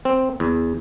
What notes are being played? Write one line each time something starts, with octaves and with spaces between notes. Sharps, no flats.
C4
E2